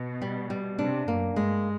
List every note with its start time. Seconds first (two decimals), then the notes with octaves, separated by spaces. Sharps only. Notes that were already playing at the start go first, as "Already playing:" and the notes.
Already playing: B2
0.22 G3
0.50 G3
0.79 C3 D4
1.08 F#2 A#3
1.36 G2 G#3